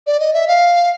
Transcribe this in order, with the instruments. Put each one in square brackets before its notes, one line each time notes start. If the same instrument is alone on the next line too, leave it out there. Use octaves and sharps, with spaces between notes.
[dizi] D5
D#5
E5
F5